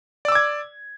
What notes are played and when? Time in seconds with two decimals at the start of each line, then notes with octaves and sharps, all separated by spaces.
0.25 D5
0.28 E6
0.32 D6
0.35 G#6